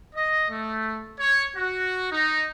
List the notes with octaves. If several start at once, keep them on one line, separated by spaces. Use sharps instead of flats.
D#5
A3
C#5
F#4
D#4